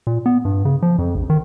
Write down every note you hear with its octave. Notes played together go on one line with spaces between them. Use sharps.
A#2
B3
G2
C#3
F3
F2
A#1
D#3